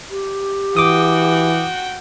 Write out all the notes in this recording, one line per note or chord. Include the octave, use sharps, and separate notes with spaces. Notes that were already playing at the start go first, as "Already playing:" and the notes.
G4
E3 F#4 G5 D6 D#6